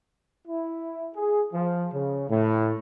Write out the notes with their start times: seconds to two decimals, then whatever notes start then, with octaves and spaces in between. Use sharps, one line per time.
0.46 E4
1.14 G#4
1.53 F3
1.92 C#3
2.29 A2